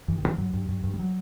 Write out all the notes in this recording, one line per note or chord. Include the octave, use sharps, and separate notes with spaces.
G2 E3
D#3
G2
E3
G2 F#3
G2
G2
G2
G3
F#3